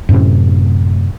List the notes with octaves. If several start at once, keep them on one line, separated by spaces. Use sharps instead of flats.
F#2 A2 C3 C#4